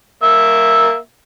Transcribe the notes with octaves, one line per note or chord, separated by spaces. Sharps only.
A#3 E5